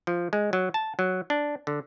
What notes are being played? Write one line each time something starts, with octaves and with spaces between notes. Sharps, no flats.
F3
G#3
F#3
A5
F#3
D4
D3